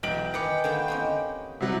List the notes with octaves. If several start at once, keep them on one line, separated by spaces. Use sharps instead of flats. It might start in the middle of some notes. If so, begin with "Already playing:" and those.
B1 E3 D4 G4 G5 D7 F#7
D#3 D#4 B4 D#5 G#5 C6 D6 C#7
D3 D#3 A#3 B5
A#3 C4 C#4 G4 D#5 G#5
C3 F#3 G3 C4 E4 F#5